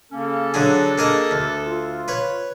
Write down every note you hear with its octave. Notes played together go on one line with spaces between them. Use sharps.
C#3 A#3 C#4 A4
D3 F#3 D4 G#4
A#3 G#4 D#5
D2
F4
B4 C#5